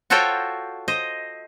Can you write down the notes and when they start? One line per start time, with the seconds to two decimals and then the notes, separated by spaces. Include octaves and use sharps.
0.10 F4 F#4 A4 C5 C#5 G5
0.88 C5 D#5